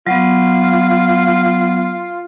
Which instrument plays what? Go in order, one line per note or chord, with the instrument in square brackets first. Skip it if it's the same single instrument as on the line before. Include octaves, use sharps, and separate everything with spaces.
[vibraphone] F#3 B3 [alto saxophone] F4